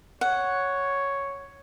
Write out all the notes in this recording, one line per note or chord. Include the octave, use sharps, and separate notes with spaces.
C#5 F#5